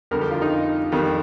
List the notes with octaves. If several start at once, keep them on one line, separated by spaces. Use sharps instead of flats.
F2 D3 G3 A#4
G4
F4
D#4
F2 D#3 G3